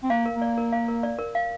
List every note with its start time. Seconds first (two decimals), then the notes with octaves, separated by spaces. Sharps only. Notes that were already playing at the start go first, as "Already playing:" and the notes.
0.03 C4
0.10 A#3 F5
0.26 A#4
0.33 A#3
0.42 D5
0.58 A#4
0.72 F5
0.88 A#4
1.03 D5
1.19 A#4
1.35 F5